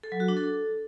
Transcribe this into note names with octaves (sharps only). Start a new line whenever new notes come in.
A4
F#3
F#4
D4
A4